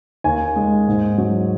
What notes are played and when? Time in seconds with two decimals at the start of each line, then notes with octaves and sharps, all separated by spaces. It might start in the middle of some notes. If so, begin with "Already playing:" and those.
0.24 D#2 G#5
0.56 G#3
0.88 G#2
1.18 F#3